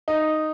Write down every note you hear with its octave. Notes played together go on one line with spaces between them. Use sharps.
D#4